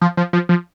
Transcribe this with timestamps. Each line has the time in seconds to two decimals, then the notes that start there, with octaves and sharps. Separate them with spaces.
0.02 F3
0.17 F3
0.33 F3
0.49 F3